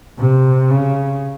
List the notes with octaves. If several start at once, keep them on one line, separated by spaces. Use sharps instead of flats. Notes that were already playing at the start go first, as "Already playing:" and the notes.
C3
C#3